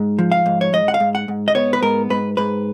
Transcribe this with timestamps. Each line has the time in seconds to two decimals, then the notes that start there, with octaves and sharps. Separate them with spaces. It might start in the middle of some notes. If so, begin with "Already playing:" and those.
Already playing: G#2
0.19 F3
0.32 F5
0.46 G#2
0.61 C#5
0.73 G#2 D#5
0.88 F#5
0.94 F5
1.00 G#2
1.15 F#5
1.28 G#2
1.48 D#5
1.55 B3 C#5
1.73 B4
1.82 G#2 A#4
2.10 G#2 B4
2.37 G#2 B4